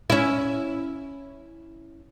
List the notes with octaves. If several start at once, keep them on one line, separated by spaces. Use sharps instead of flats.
C#4 E4